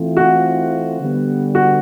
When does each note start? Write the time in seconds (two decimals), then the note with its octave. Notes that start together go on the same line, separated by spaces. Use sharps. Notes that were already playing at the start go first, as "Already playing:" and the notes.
Already playing: E3 A3 C4 F4
0.17 F#4
0.99 D3 G3 B3
1.55 F#4